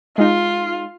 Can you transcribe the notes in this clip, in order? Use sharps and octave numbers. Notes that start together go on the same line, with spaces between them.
G#3 D#4 F4